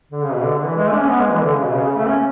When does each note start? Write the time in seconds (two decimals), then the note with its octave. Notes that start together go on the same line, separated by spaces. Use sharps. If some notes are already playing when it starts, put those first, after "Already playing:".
0.11 D3
0.22 C#3
0.33 B2
0.44 D3
0.55 D3
0.66 E3
0.76 G#3
0.87 A3
0.93 D4
0.99 C#4
1.09 B3
1.20 G#3
1.31 E3
1.42 D3
1.53 C#3
1.64 B2
1.75 C#3
1.85 C#3
1.96 A3
2.07 C#4